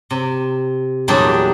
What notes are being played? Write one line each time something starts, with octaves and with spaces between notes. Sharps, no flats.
C3
E2 A#2 F#3 G3 D4 G#4